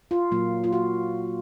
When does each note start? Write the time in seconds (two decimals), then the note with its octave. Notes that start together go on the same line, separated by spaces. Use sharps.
0.11 F4
0.31 A#2 F#3 A#3
0.64 F4
0.73 F#4